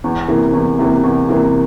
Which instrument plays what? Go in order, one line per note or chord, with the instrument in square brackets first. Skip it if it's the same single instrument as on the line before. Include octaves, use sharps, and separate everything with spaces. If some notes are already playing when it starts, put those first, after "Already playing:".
[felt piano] E2
C3 E3 A#3
E2
C3 E3 A#3
E2
C3 E3 A#3